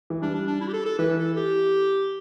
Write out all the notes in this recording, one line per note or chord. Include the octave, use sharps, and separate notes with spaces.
E3
G3 D4
D4
D4
E4
G4
A4
A4
E3 B4
A4
G4